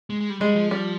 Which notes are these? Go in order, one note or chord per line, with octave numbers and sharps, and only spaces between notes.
G#3
G#3
G3
G3 G#3
F3
G3